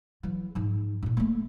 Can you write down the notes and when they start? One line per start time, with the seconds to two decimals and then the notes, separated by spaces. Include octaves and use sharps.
0.23 E3 F#3
0.55 G#2 F3
1.03 F#2 A#2
1.17 A3 A#3